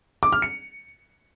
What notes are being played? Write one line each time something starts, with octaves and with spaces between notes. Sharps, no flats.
D6
F6
C#7